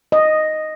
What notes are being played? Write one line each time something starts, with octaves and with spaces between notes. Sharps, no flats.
D#5